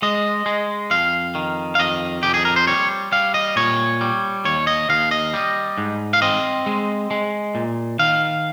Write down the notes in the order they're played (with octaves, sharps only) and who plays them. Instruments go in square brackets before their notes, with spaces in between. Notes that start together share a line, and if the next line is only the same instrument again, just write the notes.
[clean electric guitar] G#3 D#5
G#3
F2 F5
D#3
F5
F2 D#5
F2 G4
G#4
A#4
C5
G3 C#5
G3 F5
D#5
A#2 C#5
G3
D#2 C#5
D#5
D#2 F5
D#5
G3
G#2
F5
C4 D#5
G#3
G#3
A#2
D#3 F5